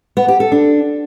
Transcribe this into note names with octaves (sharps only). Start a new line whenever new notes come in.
B3
G4
A4
D4